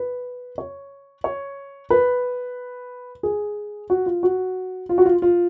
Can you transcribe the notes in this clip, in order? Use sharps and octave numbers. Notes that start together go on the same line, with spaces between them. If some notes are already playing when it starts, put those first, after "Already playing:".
Already playing: B4
C#5
C#5
B4
G#4
F#4
F4
F#4
F4
F#4
F4
F4